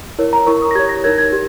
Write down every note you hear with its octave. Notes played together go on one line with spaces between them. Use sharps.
E4 A#4 C#5
A#5
E4 A#4 C#5 C#6
D#6
A#6
G4 C#5 G#6
A#6
D#4 A#4 C#5 G#6
G#6
G4